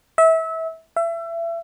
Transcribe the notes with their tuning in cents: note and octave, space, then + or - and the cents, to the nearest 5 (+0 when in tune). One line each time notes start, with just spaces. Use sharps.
E5 -25
E5 +30